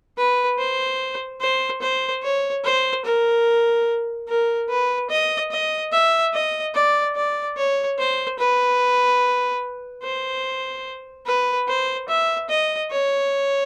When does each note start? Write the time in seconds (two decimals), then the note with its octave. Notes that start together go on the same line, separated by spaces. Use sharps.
0.17 B4
0.58 C5
1.41 C5
1.82 C5
2.23 C#5
2.64 C5
3.05 A#4
4.28 A#4
4.69 B4
5.10 D#5
5.51 D#5
5.92 E5
6.33 D#5
6.74 D5
7.15 D5
7.57 C#5
7.98 C5
8.39 B4
10.03 C5
11.26 B4
11.68 C5
12.09 E5
12.49 D#5
12.91 C#5